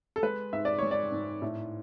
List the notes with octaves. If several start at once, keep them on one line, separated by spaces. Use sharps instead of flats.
A4
G#3 B4
G#2 E5
D5
G#3 C#5
D5
G#2
A2